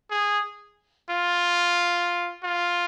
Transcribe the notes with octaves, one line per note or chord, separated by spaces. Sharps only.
G#4
F4
F4